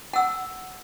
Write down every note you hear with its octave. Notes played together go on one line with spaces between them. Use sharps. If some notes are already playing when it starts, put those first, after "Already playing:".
F#5 E6